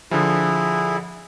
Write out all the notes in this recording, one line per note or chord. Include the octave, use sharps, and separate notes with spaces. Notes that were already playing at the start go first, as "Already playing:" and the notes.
D3 F3 E4 G#4